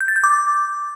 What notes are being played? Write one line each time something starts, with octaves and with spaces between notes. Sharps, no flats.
G6
A6
G6
D6